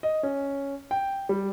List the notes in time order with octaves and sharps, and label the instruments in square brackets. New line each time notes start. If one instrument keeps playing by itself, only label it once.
[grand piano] D#5
C#4
G5
G3